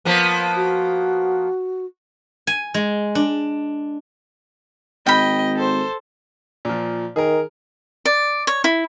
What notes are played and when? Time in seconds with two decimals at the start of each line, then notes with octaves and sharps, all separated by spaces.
0.05 F3 A#3 B3
0.56 F#4
2.47 G#5
2.74 G#3
3.15 D4
5.06 G#1 D#5 G5 B5
5.56 A4 C5
6.65 A#2 F3
7.16 D#3 G#4 A#4
8.05 D5
8.47 C#5
8.64 E4